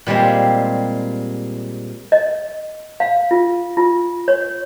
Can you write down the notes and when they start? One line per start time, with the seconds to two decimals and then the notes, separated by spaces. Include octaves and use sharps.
0.06 A#2 G3 G#3 C4
2.12 D#5
3.00 F5
3.31 F4
3.77 F4
4.28 C#5